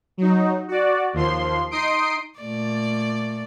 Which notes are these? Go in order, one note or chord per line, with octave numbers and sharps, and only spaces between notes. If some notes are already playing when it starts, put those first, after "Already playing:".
F#3 D#4
F#4 D5
D#2 F3 C6
D#4 C6 D#6 C7 D7
A#2 A3 D5